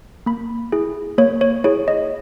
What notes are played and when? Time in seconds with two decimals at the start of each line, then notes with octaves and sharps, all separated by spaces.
0.26 A#3 B5
0.72 E4 G#4
1.18 A#3 C#5
1.41 C#5
1.64 E4 G#4 C#5
1.88 D#5